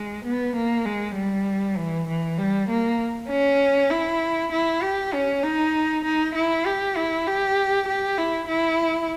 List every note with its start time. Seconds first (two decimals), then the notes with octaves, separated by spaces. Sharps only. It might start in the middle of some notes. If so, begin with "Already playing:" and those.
Already playing: G#3
0.25 B3
0.56 A#3
0.86 G#3
1.16 G3
1.77 E3
2.08 E3
2.39 G3
2.69 A#3
3.30 C#4
3.91 E4
4.52 E4
4.83 G4
5.14 C#4
5.44 D#4
6.05 D#4
6.35 E4
6.66 G4
6.97 E4
7.27 G4
7.88 G4
8.18 E4
8.49 E4